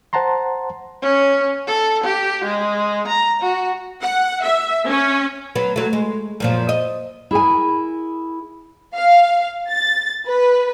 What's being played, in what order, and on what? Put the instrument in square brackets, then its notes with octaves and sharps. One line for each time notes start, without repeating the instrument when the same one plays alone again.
[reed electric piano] C5 F#5 A5 A#5 C6
[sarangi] C#4
A4
G4
G#3
A#5
F#4
[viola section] F#5
E5
C#4
[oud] F#3 B3
F#3 A3
G#3
F#2 A#2 F3
D#5
[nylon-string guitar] E4 G#4 A#4 G#5
[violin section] F5
A6
B4